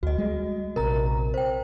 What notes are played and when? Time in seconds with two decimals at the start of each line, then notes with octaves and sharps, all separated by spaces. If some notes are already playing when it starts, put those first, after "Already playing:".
0.03 D2 F#4 D#5
0.18 G3 G#3
0.76 A#1 C3 A#4 A#5
1.34 C5 G5